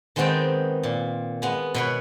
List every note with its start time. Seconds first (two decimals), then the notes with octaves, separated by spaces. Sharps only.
0.16 D#3 G#3 B3 C4 G5 A5
0.83 A#2
1.42 G#3 B3
1.74 B2 B4 C#5